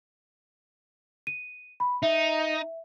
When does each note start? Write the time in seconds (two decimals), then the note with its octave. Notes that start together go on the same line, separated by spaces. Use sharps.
1.27 D#7
1.80 B5
2.03 D#4 E5